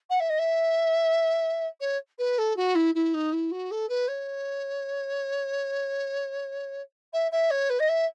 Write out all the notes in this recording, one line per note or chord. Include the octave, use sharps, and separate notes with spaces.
F#5
E5
D#5
E5
C#5
B4
A4
F#4
E4
E4
D#4
E4
F#4
A4
B4
C#5
E5
E5
C#5
B4
D#5
E5